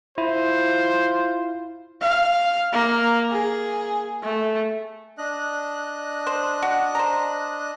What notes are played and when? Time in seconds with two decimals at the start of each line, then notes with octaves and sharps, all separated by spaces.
0.18 E4 F4 C5
2.02 F5
2.73 A#3
3.31 G#4
4.23 A3
5.18 D4 D#5 F#6
6.27 C5
6.63 F#4
6.95 C5 A#5